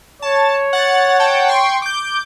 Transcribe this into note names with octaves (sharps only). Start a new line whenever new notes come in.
C#5 A5
F#5 F#6 A6
F#5 G5 A5
G5 C6 C#6
D6 G6